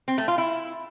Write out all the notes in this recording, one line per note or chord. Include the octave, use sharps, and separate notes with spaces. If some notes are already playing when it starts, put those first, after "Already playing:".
C4
A3
F4
E4